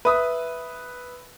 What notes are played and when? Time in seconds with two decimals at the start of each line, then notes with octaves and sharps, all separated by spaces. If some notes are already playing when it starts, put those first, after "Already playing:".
0.05 B4 E5 D#6